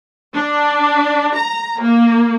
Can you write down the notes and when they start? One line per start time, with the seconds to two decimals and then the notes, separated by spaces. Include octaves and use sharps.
0.35 D4
1.35 A#5
1.81 A#3